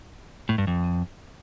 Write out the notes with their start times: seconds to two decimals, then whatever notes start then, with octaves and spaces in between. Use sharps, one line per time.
0.49 A2
0.58 G2
0.67 F2